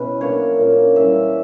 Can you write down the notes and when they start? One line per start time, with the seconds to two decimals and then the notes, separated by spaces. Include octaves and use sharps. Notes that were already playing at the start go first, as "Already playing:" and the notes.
Already playing: B2 C#4 E4 B4
0.21 F#3 A#3 D4 C#5
0.58 A#2 A#3 C#4
0.96 E3 G3 C#4 E5